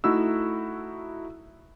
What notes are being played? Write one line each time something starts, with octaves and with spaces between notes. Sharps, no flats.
A3 D#4 E4 F#4 E6